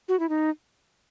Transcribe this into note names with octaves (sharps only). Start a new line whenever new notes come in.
F#4
E4
D#4